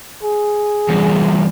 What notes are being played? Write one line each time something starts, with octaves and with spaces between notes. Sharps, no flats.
G#4
E2 G2